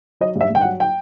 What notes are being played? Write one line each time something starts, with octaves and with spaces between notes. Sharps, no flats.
F#3 D#5
G2
E5
G2 G5
F#5
F#3
G5